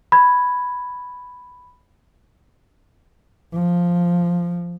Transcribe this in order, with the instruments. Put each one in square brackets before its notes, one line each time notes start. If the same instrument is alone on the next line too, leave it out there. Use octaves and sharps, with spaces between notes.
[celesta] B5 G#6
[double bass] F3